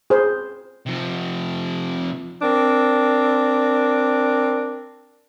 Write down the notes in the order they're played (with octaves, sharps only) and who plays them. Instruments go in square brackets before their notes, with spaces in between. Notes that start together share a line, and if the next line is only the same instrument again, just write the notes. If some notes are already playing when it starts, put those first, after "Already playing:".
[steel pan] G#4 C5
[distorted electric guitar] C3 F3
[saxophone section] C4 D4 A#4